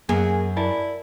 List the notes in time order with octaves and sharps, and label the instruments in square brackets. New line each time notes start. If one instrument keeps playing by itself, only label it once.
[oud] F#2 [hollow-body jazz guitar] A#3 [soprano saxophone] G#4
[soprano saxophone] E4 [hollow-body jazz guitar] A#4 D5 A5